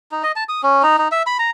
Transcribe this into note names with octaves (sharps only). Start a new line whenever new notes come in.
D#4
D#5
A5
D#6
C#4
D#4
D#4
E5
B5
A#5